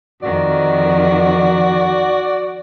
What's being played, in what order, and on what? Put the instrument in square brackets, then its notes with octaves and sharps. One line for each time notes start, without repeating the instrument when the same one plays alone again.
[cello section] F2 D#3 [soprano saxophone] F#4 [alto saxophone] D5